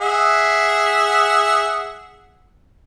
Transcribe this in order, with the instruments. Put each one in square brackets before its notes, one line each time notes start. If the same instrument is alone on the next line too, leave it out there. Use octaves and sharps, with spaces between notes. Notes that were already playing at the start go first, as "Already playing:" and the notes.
[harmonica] G#4 E5 F#5